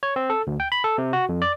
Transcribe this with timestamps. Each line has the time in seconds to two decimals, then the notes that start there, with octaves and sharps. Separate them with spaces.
0.03 C#5
0.16 C4
0.30 A4
0.47 D2
0.60 G5
0.72 B5
0.84 A4
0.98 C3
1.13 F#4
1.29 F2
1.42 D5